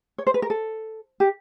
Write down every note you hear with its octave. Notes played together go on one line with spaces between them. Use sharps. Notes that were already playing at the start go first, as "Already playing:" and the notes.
C#5
C5
B4
A#4
A4
G4